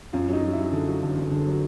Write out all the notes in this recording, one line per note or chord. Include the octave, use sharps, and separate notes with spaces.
F#2 F4
F#3 D#4
F#3
E4
F#3
D3
F#3
G1
G1
D3
F#3